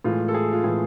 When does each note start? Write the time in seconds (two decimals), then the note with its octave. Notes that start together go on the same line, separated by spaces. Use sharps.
0.04 A2 E3 G#3 F4
0.28 A4
0.34 G#4
0.53 F4
0.64 A2 E3 G#3 G#4